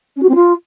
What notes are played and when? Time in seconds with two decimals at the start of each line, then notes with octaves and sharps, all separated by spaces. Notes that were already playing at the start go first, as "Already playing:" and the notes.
0.16 C#4
0.22 F#4
0.29 C4
0.35 F4